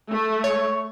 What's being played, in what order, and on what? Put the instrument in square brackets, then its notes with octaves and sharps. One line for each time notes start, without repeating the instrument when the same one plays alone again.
[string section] A3
[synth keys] C#5